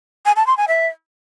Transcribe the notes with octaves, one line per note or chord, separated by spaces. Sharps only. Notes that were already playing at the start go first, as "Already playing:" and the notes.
G#5
A5
C6
G#5
E5